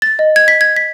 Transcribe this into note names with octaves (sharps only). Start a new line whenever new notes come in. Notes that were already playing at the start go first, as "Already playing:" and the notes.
A6
D#5
G#6
B6
G#6
B6